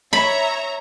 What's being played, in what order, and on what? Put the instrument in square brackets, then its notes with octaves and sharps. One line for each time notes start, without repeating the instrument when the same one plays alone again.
[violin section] C#5 E5 A#5 [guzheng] B5